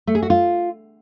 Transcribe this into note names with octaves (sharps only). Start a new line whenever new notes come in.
A3
G#4
F#4
F4